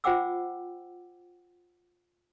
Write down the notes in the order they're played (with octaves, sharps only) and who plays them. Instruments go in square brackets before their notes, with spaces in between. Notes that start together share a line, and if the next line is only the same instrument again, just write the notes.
[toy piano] F4 C5 F#5 G5 D6 E6